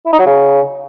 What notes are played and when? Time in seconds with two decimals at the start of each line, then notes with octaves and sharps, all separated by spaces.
0.06 E4
0.13 D#4
0.20 F#3
0.26 C#3